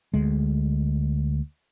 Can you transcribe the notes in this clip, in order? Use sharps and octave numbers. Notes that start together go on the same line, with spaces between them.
D2 G#3